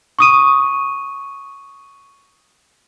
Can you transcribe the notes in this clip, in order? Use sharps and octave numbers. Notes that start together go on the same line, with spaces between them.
C#6 D#6 D#7